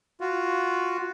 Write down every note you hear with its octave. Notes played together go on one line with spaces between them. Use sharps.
F4 F#4